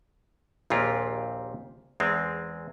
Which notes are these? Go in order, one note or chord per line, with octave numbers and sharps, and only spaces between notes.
A#1 D#2 A#2 C4 F4 G4
E2 G#3 C4